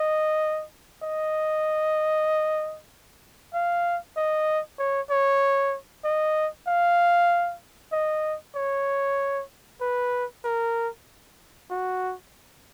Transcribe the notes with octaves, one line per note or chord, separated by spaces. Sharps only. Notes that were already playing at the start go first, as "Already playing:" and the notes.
Already playing: D#5
D#5
F5
D#5
C#5
C#5
D#5
F5
D#5
C#5
B4
A#4
F#4